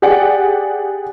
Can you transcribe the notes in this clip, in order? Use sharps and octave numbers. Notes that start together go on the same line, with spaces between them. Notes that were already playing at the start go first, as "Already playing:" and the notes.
G4 G#4 D5 F#5 G5